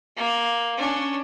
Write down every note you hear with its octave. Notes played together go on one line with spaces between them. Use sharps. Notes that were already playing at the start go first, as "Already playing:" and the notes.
A#3
C#4 D4